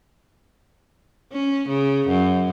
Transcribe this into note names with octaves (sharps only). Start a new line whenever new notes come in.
C#4
C#3
F#2